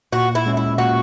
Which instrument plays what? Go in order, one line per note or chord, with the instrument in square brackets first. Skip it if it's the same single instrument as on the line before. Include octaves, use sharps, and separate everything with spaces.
[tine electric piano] A#2 [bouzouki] F#4
[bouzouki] E4
[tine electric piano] G#3 C#4
[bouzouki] E4
[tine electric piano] A#2 [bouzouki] F#4